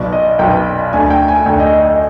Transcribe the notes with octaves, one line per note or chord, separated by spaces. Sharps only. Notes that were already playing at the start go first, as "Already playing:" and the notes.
Already playing: B1 B2 D5
D#5
B1 B2 G5
D2 D3 G#5
G5
G#5
D2 D3 G5
D#5
D#5
D#5